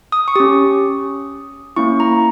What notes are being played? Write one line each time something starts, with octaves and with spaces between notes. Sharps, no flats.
D#6
C#6
C#4 G4 D#6
A#3 C#4 E4 C#6
A#5